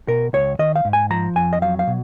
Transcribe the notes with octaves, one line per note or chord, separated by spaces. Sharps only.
B2 A#4
C#2 C#5
D#3 D#5
F5
G#2
G#5
F3 A#5
F2 G#5
D#5
F#3 F5
F5
B2